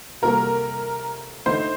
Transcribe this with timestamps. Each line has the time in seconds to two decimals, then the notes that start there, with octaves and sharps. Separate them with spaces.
0.22 C3 G3 A#3 F#4 A4 A#4
1.46 D3 A3 D#4 A4 C5